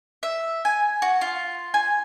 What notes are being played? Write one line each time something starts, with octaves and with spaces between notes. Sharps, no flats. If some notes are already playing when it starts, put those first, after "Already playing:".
E5
G#5
F#4
F4
G#5